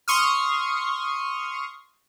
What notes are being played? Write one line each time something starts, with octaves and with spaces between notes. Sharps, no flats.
C6 C#6 D#6 F6